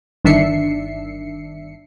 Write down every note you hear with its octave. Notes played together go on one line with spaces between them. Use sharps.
G1 D#3 D4 E5 C7 C#7